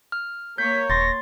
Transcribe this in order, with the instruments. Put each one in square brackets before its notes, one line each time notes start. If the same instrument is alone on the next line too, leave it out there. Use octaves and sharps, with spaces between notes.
[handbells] F6
[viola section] A#3 C#5 [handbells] G6 [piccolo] B6
[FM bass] D#1 [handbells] C6 A6 [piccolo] A#6